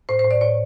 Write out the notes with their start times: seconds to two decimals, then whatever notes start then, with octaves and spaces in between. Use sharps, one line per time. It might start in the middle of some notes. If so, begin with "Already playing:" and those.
0.09 A2 C5
0.19 C5
0.24 A2
0.31 D5
0.41 A2 C#5